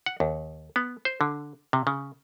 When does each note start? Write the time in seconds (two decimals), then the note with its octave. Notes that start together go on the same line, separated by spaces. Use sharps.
0.06 F#5
0.20 D#2
0.76 B3
1.05 C5
1.21 D3
1.73 C3
1.87 C#3